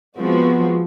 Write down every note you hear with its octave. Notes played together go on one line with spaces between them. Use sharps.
F3 G#3 B3 C4 F#4